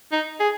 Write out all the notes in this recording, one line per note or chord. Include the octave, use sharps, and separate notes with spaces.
D#4
G#4